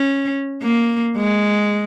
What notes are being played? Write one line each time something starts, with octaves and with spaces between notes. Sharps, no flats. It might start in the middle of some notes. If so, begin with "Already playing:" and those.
Already playing: C#4
A#3
G#3